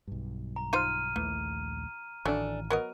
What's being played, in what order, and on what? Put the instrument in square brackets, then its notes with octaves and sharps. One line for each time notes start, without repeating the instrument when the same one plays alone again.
[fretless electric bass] B1 G2
[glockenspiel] A#5
[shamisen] D#4 F4 C5 [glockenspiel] F6 D#7
[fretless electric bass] A#1 D#2 A3 [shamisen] E3
[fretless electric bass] A1 D#3 [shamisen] F#3 A3 [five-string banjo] D4 A4 G#5
[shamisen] F#3 B3 D#5 [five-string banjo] A#4